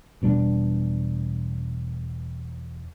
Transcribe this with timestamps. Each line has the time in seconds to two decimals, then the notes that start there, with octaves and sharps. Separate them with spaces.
0.22 E1 B2 G3 D4